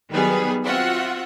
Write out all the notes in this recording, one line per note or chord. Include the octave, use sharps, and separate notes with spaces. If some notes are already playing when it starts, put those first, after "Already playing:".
D#3 F#3 G3 B3 G#4 B4
C4 F4 F#4 E5 F#5